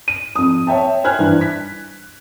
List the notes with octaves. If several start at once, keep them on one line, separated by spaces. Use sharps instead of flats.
D#7
F2 D#6
C#5 E5 G5 A5
C5 G#5 F6 F#6 G#6
G2 E3
B6